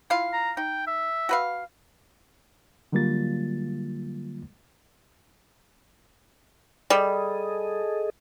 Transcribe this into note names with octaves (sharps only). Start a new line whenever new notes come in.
E4 F4 F5
A#5
D#4 G5
E5
F#4 B4 F5
D3 F#3 G3 A#3 F4 A6
G3 G#4 A4 D#5